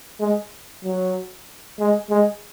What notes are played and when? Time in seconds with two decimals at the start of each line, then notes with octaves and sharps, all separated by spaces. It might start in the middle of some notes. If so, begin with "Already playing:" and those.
0.20 G#3
0.84 F#3
1.79 G#3
2.11 G#3